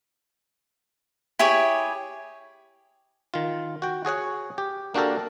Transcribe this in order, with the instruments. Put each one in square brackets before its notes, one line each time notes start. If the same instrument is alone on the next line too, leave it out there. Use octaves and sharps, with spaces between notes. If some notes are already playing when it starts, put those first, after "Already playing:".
[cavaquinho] E4 G4 G#4 C#5
[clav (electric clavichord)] D#3 F4
F#4 G5
F#4 G#4 C#5 F#5
G4
A#3 D4 F#4 G4 A4 A#4